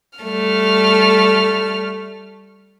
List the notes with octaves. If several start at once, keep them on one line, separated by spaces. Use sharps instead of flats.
G3 A3 F6